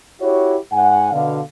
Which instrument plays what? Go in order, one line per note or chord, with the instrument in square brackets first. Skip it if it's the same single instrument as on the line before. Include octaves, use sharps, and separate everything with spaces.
[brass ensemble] E4 F#4 G4 C#5
G#2 F#5 G#5
B2 D3 F5